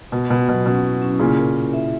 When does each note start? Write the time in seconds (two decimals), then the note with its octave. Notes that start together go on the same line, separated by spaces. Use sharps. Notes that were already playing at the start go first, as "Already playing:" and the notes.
0.12 B2 F#4
0.30 B2 B3
0.48 B2 F#3
0.66 B2 C#4
0.84 E4
1.02 C#4
1.19 A#2 C#3 E4
1.38 A#4
1.56 E4
1.73 E5